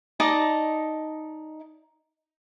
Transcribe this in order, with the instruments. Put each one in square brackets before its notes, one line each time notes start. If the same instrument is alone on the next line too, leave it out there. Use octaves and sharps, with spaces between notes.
[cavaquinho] D#4 D5 D#5 A5